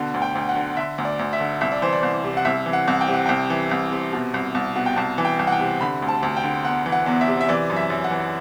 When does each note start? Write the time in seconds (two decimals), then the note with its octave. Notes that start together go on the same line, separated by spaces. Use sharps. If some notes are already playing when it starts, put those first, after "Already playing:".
Already playing: B2 D3
0.14 D2
0.22 G5
0.35 D2
0.49 F#5
0.56 D3
0.77 D3 E5
0.98 D2
1.05 D5
1.19 D2
1.33 E5
1.40 D3
1.61 C2 E5
1.72 D5
1.82 E3 C5
1.93 D5
2.03 C2
2.24 C3
2.37 F#5
2.45 C2 E5
2.66 E3
2.73 F#5
2.88 C2
3.01 G5
3.08 C3
3.13 F#5
3.26 C2 G5
3.50 E3
3.71 C2
3.92 C3
4.13 B2
4.34 C2
4.55 C2
4.76 B2 F#5
4.86 G5
4.96 C2 A5
5.18 E3
5.25 G5
5.39 C2
5.47 F#5
5.52 G5
5.59 C3
5.81 D3 B5
6.02 D2
6.08 A5
6.23 D2
6.37 G5
6.44 D3
6.65 E2 F#5
6.86 E3
6.92 F#5
7.06 E2
7.21 E5
7.28 C3
7.41 E5
7.49 E3 D5
7.70 F#2
7.76 E5
7.90 F#2
8.04 F#5
8.11 E3